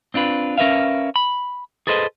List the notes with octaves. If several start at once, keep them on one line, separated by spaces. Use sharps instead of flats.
C4 D4 F4 B4
C#4 A#4 B4 E5 F5
B5
G#4 A4 B4 C5 D#5